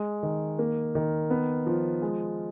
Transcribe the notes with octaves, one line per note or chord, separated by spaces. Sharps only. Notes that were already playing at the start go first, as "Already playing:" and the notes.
Already playing: G#3
D#3
A#3
D#3
B3
F3
G#3